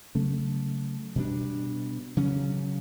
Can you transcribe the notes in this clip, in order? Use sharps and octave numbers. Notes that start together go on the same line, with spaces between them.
C#3 F#3 A3 C#4
B2 G3 D4
C#3 F#3 C#4